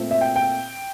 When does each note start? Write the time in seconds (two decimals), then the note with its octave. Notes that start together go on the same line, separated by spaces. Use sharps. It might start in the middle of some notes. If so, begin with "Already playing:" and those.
Already playing: A#2 A3 C4
0.11 E5
0.21 G5
0.36 G5